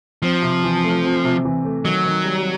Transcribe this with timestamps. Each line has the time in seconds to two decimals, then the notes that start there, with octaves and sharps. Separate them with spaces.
0.22 F3 C4
0.42 C3
0.64 E3
0.84 A3
1.04 C4
1.24 C3
1.45 E3
1.65 A3
1.85 D#3 F#3
2.05 D#3
2.25 G3